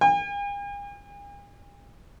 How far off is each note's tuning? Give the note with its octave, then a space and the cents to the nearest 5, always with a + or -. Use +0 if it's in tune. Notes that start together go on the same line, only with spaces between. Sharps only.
G#5 -45